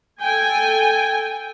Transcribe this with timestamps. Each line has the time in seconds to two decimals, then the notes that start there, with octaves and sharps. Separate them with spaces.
0.22 A4 G5 G#5